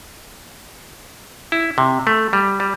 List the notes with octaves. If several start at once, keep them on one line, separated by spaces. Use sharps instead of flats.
E4
C3
A3
G3
G3